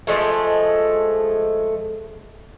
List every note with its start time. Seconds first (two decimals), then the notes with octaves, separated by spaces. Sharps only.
0.07 F3 G#3 A3